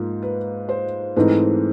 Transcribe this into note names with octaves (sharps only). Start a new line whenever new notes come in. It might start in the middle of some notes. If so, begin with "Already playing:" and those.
Already playing: G#2 F3 A#3
B4
C5
G#2 E3 A3 C4 D#4 B4